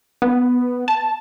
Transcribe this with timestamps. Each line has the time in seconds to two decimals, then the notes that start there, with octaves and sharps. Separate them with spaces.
0.22 B3
0.88 A5